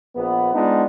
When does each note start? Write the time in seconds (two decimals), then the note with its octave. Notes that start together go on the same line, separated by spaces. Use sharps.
0.15 A#1 B3
0.55 G#3 B3 D4 D#4 F4